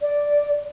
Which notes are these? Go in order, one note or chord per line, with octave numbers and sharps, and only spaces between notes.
D5